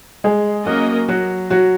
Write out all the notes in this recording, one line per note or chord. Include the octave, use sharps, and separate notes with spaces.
G#3 G#4
F#3 A#3 C#4 F#4 A#4 D#5
F#3 F#4
F#3 F#4